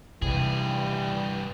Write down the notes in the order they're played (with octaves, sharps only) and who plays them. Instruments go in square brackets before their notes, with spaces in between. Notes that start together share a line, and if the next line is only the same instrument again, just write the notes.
[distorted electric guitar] G2 G#4 [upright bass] C3 [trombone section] E3 G3